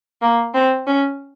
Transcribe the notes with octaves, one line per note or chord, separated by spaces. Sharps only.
A#3
C4
C#4